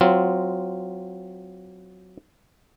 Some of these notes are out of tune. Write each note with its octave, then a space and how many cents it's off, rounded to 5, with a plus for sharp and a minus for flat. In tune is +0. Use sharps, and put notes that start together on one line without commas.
F#3 +0 C4 -15 F4 +0